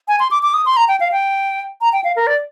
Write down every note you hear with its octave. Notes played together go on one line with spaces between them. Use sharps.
G#5
C6
D6
D6
D#6
C6
A#5
G5
F5
G5
A#5
G5
F5
A#4
D5